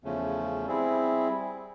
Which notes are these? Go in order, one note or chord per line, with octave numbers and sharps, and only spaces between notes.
E2 C#3 F3 A3 C#4
G3 C4 E4 G#4